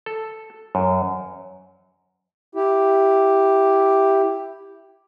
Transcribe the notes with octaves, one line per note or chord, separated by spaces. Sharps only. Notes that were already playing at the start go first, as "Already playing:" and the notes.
A4
F#2
E4 G4